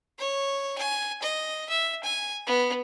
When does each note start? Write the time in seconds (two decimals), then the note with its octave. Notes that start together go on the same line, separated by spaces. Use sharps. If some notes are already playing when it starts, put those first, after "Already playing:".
0.19 C#5
0.78 G#5
1.22 D#5
1.69 E5
2.03 G#5
2.47 B3